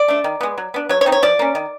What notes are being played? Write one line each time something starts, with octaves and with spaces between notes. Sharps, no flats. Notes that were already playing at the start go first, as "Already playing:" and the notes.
Already playing: D5
A3 D4
D#3
G#3 B3
F#3
B3 D4
F#3 C#5
C#5
A3 C4 D#4
C#5
F3 D5
A#3 C#4
D#3